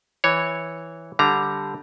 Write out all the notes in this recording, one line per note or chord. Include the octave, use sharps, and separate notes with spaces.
E3 C#5
D3 G3 A#5